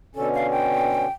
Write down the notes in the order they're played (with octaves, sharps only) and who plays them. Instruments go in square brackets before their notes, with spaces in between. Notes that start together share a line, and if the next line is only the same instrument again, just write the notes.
[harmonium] B2 D3 C#4 [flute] A4
[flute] F5
G5